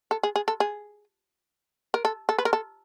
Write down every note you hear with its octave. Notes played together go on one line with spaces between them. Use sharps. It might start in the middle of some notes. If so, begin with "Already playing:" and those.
A4
G#4
G#4
A4
G#4
A#4
A4
A4
B4
A#4
A4